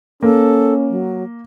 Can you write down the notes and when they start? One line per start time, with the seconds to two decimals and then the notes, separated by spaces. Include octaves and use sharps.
0.23 A#3 C#4 A4
0.90 F#3